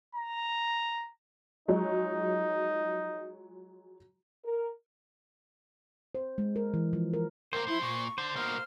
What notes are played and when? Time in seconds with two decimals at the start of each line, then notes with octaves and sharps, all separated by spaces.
0.15 A#5
1.68 F3 F#3 G#3 D#4
4.45 A#4
6.15 C5
6.38 G#3
6.56 A#4
6.74 E3
6.93 F3
7.13 A#4
7.53 C#2 A#3 A#4 C5
7.68 F3 E4
7.82 A#2 C#6
8.18 D3 C5
8.36 B2 A#3 F6